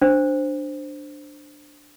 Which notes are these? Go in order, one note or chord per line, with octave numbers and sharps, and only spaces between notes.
D4 C5